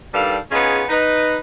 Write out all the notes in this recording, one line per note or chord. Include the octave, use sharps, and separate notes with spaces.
D#3 G3 D4 A4 B4 F5
B3 C#4 D#4 F4 G#4
D#4 B4